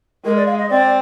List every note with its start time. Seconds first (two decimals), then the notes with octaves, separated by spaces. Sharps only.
0.25 G#3 A#4
0.36 D5
0.47 F5
0.58 D#5
0.70 C4 D5